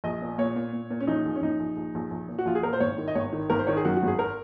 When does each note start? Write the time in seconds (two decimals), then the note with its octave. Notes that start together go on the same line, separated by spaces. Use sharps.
0.04 A#1 D#5
0.22 A#2
0.38 A#2 C#5
0.56 A#2
0.73 A#2
0.91 A#2
1.01 C#4
1.07 A#1 D#4
1.26 A#1
1.36 C#4
1.42 A#1 D#4
1.60 A#1
1.77 A#1
1.95 A#1
2.11 A#1
2.28 A#2
2.39 F#4
2.46 A#1 F4
2.55 G#4
2.63 A#2 A#4
2.73 C5
2.80 G#1 C#5
2.98 D#3
3.08 D#5
3.15 G#1 C#5
3.32 D#3
3.50 G#1 A#4
3.59 C5
3.67 D#3 C#5
3.77 G#4
3.85 F#2 F#4
3.97 F#4
4.03 G#1 G#4
4.19 A#4